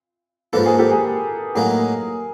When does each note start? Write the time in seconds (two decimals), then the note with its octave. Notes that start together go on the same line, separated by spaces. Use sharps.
0.53 G#2 F3 A#3 A4 B4
0.66 G#4 A#4
0.79 G4 A4
0.91 G#4 A#4
1.55 A2 F#3 A#3 D#4 G#4 A#4